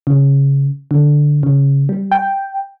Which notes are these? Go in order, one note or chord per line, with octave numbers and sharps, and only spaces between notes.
C#3
D3
C#3
G3
G5